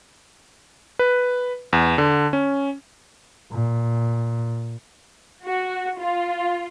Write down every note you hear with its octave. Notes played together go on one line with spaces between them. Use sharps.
B4
E2
D3
C#4
A#2
F#4
F4